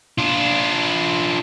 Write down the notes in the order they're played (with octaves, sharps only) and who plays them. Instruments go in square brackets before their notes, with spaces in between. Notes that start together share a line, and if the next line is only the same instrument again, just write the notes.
[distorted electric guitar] D4 F4